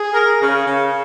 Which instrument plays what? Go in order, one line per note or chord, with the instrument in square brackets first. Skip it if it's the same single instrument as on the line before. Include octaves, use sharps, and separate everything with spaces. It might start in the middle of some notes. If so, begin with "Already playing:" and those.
Already playing: [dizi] G#4
[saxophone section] A#4
C#3
C#3